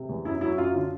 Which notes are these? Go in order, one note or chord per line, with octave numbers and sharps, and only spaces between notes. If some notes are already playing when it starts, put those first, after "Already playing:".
Already playing: C3
E2
F#2 E4
F#3 E4
F#2 F4
D3 F4